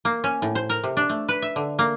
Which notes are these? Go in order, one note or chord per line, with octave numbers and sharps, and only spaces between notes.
A#3
C#4
A2
C5
A#4
C3
D4
A3
B4
E5
D3
A#3